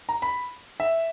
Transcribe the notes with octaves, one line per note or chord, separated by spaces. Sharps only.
A#5
B5
E5